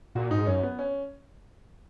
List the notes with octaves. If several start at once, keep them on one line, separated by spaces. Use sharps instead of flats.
A#2 F#4
G#2 D#4
F#2 C#4
B3
C#4